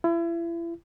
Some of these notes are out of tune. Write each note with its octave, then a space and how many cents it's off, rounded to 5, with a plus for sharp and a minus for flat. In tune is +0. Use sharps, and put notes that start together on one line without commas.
E4 +35